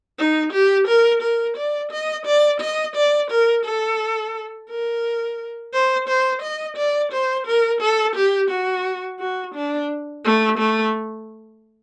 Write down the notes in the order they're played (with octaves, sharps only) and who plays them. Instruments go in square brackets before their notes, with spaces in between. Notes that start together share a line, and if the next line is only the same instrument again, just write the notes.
[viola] D#4
G4
A#4
A#4
D5
D#5
D5
D#5
D5
A#4
A4
A#4
C5
C5
D#5
D5
C5
A#4
A4
G4
F#4
F#4
D4
A3
A3